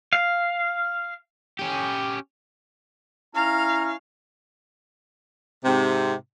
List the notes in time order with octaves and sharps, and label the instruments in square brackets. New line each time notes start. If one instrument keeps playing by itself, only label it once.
[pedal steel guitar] F5
[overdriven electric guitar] C#4 G4
[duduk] C#4 [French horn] E4 [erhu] F5 [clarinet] A#5
[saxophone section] G#2 C3